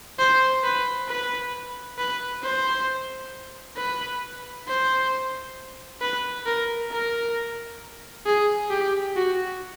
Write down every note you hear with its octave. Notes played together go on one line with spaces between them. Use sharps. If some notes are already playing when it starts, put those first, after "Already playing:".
C5
B4
B4
B4
C5
B4
C5
B4
A#4
A#4
G#4
G4
F#4